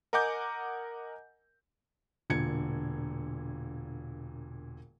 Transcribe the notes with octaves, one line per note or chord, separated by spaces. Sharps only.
A#4 D#5 F#5 G#5 D6 G6
E1 A#2 D3 G#6 C#7